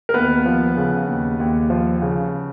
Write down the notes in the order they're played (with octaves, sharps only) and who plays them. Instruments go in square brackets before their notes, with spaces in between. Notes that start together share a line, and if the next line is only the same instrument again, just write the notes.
[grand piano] A#4
D#2 B3 B4
F3
C#3
D#2
D#2
F3
C#3